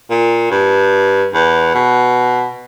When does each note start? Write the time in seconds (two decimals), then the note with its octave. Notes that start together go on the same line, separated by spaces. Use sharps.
0.10 A#2
0.51 G2
1.34 E2
1.74 B2